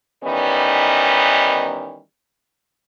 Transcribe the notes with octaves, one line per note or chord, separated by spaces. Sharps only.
D#3 E3 G3 B3 C#4 D#4